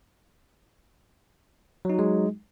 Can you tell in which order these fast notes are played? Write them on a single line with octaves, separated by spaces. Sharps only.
F#3 D#4 F#4 G#3